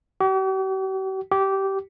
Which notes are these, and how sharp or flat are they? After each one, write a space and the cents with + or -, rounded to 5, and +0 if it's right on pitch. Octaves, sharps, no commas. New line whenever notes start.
G4 -45
G4 -15